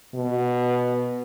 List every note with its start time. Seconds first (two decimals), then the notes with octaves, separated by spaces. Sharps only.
0.15 B2